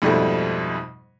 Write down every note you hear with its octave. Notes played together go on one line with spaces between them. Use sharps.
F2 G#2 B2 G3 A3